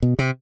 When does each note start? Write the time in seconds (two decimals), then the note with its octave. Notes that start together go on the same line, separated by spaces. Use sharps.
0.02 B2
0.19 C3